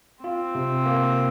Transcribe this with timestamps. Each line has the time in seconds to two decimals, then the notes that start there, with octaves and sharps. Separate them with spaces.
0.24 C4 F4
0.55 C3
0.86 A#3